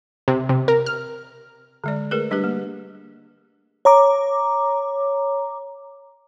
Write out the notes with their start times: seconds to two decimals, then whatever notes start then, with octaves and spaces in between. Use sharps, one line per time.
0.28 C3
0.49 C3
0.68 A#4
0.86 F6
1.84 D3 G#3 D5
2.11 A3 G#4 A#4 B4
2.31 G3 D4 G4 B4
2.44 A#3
3.85 C#5 A#5 D6